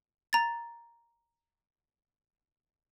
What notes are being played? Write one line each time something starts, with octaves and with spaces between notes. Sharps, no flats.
A#5 A6